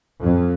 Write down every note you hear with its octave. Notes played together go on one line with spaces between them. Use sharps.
F2